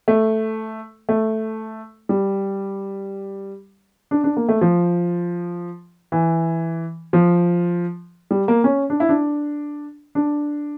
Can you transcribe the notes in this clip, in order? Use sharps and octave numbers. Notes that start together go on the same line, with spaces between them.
A3
A3
G3
D4
D4
A#3
A3
F3
E3
F3
G3
A#3
C#4
D4
E4
D4
D4